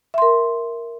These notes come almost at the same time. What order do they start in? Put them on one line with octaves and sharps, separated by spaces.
E5 C6 A#4